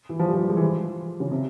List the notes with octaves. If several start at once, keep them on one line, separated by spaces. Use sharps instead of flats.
E3
F3
G3
F3
G3
G#3
E3
F3
C#3
C3